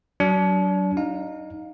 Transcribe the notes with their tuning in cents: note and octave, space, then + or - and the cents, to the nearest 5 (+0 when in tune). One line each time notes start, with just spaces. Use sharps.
F#3 +25 D4 -30
D#4 +0 F5 +20